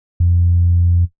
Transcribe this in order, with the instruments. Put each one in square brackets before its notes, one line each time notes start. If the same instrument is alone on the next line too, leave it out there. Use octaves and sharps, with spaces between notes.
[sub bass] F2